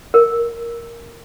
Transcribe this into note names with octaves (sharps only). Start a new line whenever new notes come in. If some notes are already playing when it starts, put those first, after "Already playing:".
A#4